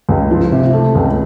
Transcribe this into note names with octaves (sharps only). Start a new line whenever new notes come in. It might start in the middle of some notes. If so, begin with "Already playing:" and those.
C#2
F3
C3
A3
C#2